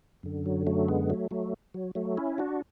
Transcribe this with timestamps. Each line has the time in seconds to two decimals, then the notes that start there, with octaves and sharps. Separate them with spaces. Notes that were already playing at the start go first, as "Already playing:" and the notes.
0.23 F#2 D3
0.46 F#3
0.67 F#3 A3
0.88 G#3 B3
1.10 F#3 A3
1.31 F#3 A3
1.74 F#3
1.95 F#3 A3
2.17 C#4 E4
2.38 D4 F#4